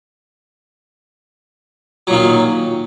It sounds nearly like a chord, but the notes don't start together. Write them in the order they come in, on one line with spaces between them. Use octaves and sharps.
F#3 A#2 D#3